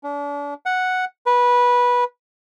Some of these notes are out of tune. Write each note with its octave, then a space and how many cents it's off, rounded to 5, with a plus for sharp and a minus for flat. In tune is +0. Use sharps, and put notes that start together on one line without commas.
D4 -40
F#5 -5
B4 -15